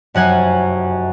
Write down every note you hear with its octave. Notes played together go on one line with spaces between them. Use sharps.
F1 F#2 F#5 G#5